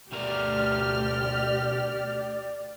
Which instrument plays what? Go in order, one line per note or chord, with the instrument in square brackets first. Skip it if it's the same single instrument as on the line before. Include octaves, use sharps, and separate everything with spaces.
[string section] D2 F6 [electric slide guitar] B2 A3 A#4 [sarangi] G4 [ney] D5